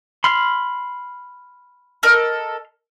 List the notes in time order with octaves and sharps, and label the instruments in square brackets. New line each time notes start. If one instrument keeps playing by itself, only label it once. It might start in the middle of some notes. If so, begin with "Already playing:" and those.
[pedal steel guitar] B5 C6 F6
[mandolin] A4 A#4 D#5